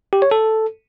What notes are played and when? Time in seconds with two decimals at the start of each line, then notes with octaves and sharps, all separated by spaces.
0.13 G4
0.22 C#5
0.31 A4